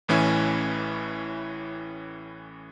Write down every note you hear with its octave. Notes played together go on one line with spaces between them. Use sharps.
A1 A2 E3 C#4 E4 G#5